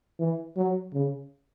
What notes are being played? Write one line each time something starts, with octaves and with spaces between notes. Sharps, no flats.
E3
F#3
C#3